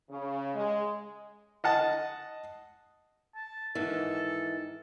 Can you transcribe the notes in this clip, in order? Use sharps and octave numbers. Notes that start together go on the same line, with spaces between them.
C#3
G#3
D#5 F#5 A5
A5
G#2 D#3 E3 A4